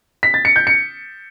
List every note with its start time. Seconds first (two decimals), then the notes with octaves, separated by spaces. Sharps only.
0.23 B6
0.34 A6
0.45 C#7
0.56 G6
0.67 C#7